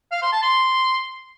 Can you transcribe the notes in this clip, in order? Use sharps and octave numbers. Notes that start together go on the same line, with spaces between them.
F5
C6
A5
C6